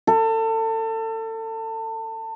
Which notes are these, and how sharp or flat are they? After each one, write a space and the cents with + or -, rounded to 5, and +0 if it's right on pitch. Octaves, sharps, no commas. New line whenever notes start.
A4 +30